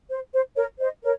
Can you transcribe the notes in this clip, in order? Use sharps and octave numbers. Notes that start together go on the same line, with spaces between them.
C5
C5
A#4 C#5
C5 D#5
A#4 C#5